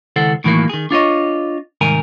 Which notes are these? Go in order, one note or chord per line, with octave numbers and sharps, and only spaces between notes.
C#2 D#3 E4 A4 C5 F#5
A2 D#3 E3 F#3 G3 A#3
D#3 G#4
D4 F4 C#5 D#5
C2 G#2 D#3 A#4 G#5